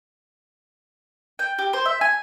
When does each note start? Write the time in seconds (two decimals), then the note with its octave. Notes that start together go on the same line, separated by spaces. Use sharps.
1.39 G5
1.58 G4
1.73 C5
1.85 E5
2.01 G#5